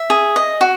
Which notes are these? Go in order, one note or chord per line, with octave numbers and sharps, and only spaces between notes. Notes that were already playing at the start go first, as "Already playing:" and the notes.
Already playing: E5
G#4
D#5
F#4